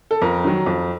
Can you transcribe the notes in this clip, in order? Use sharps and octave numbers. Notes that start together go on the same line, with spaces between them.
A4
F2 A#4
D#3 F#3
F2